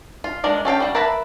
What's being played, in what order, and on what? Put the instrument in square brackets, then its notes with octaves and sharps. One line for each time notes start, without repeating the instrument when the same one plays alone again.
[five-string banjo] F4
G#3 D4 A#4
C#4 A4 F5 G5
G3 F#4
A#4 B4 E5 A5 B5